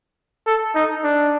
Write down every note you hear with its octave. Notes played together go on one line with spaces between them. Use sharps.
A4
D#4
D4